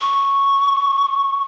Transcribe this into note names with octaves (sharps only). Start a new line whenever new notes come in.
C#6